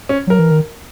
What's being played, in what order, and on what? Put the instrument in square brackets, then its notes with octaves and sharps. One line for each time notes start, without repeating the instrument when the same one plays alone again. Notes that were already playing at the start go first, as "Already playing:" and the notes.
[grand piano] C#4
[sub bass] F#3 [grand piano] A#4
[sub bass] E3
D#3